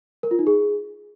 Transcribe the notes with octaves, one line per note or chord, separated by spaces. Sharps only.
A#4
F4
D#4
G#4